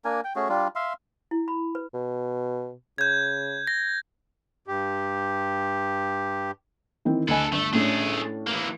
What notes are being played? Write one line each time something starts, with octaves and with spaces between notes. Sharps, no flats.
A#3 D4 A#4 G#5
G5
A3 C#4 F#4 G#4
G3 D4 F4
E5 F5 C6
E4
B5
B4
B2
C#3 G6 G#6
A#6
G2 G4
D#3 E3 C4
D2 A4 B4 D#5 G#5
G1 A3
A2 A3 C#4 D4 G#4
E3 A#3